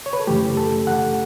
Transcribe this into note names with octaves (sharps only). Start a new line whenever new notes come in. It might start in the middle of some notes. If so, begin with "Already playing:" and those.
C#5
B4
A4
F#2 C#3 E3 A3 G4
A4
F#5